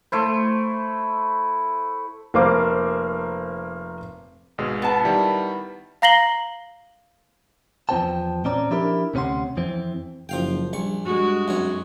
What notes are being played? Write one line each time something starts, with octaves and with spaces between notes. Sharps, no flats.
A3 E4 C5
F1 A#3 C5 D6
G#1 B2 G#3
B3 A5
D#3 G3 E4
F5 A#5 A#6 C7 F#7 G7
E2 F3 C4 C5 G5 A5
A#2 C4 C#4 D5 A#5
F3 D4 E4 G4 A#4
D2 C3 C#4 B4 F#5 C6
F2 E3 C4
F#1 F3 F5 G5
A#1 G3 C#6
G2 G#3 F#4
B1 F#2 C#5